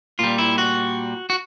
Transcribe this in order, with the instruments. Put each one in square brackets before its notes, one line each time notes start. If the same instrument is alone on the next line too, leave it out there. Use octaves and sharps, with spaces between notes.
[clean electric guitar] A#2 G3 F4
E4
F#4
F#4